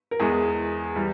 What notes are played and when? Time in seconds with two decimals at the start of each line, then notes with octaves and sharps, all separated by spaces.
0.11 A#4
0.20 E2 E3 G#3 G#4
0.96 E3 G3